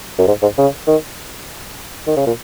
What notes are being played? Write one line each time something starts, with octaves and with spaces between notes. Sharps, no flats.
F#2
G#2
G#2
C#3
D#3
D#3
C#3
A#2